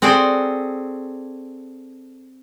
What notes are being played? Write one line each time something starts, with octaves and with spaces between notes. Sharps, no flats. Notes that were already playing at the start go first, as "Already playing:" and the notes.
C4 F#4 G#4 A4 D5